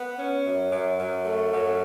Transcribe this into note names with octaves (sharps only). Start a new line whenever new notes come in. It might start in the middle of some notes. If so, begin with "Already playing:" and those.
Already playing: B3
C#4
F#2
F#2
F#2
A3
F#2